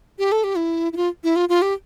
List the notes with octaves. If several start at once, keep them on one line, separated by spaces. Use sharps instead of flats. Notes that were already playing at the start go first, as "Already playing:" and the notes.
G4
A4
G4
E4
E4
F4
E4
F4
F4
G4